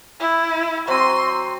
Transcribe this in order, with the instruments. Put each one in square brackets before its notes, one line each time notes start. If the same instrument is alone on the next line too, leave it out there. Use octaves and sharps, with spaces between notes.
[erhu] E4
[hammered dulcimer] F#3 C4 [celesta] C5 D#7 [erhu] C6